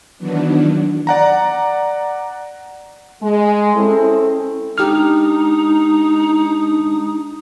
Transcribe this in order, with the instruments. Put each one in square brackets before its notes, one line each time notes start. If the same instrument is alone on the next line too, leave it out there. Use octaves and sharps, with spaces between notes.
[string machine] D#3 E3 F#3 B3 D4
[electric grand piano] D5 F#5 A#5
[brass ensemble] G#3
C4 C#4 E4 A4
[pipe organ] G#3 D4 D#6 [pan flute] D#4 [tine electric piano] G4 F6